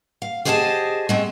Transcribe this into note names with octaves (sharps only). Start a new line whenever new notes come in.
F5
G4 G#4 C5 D#5 G5 A5
G#3 A3 C4